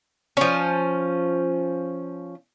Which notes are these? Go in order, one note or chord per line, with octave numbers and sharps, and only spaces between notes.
F3 C#4